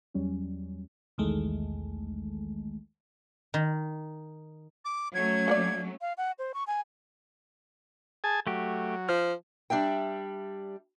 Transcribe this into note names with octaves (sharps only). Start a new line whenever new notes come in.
E2 F#3 G3 C#4
B1 E2 D#3 G#3 A3
D#3
D6
F#3 A3 C#4 G#6
A#3 B4 D5
F5
F#5
C5
C#6
G#5
G#4 G#5 A5
F#3 A3 G4
F3 F6
G3 D4 E5 G5